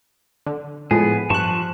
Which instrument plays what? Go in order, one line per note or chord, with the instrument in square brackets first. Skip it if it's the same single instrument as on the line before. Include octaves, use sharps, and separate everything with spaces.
[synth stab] D3
[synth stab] A2 F3 G#3 [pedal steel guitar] B3 G#4
[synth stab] G2 F#6 [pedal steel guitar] F3 A5 C#6